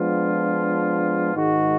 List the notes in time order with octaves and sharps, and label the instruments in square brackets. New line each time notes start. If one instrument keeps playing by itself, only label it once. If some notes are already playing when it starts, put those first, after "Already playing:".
Already playing: [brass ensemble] F3 G#3 B3 D4 F4
G#2 D#3 G#3 D#4 F#4